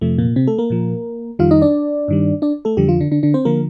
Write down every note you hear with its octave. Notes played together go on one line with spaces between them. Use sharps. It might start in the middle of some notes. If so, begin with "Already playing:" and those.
F2 C3 F3 A3
A#2 A#3
C3 C4
A3 A4
A#3 A#4
A#2 F3
F2 D#3 G3 F4 F5
D#4 D#5
D4 D5
G2 D#3 G3
D4 D5
A3 A4
F2 D3 F3 G3 G4
F3 F4
D3 D4
D3 D4
D3 D4
C4 C5
D3 F3 A#3 A#4